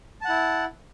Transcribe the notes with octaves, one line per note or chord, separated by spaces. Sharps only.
E4 F#5 A5